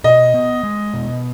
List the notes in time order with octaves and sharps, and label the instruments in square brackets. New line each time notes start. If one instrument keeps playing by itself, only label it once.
[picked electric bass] B2 [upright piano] D#5
[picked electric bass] B3
G#3
B2